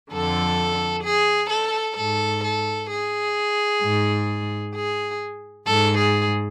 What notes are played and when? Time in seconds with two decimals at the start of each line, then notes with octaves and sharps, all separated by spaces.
0.11 F2 D3 A4
1.04 G#4
1.50 A4
1.96 G#2 A4
2.43 A4
2.89 G#4
3.82 G#2
4.74 G#4
5.66 G#2 A4
5.97 G#4